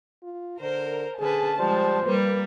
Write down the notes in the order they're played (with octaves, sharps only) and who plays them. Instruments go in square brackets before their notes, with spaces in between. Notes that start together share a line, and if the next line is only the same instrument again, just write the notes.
[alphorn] F4
[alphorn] D3 [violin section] A#4 [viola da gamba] C5
[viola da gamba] D3 C#4 B4 [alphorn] G#4 [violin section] A5
[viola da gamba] F3 G#3 [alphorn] G3 [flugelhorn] C5
[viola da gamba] G3 [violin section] A#3 [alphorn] B4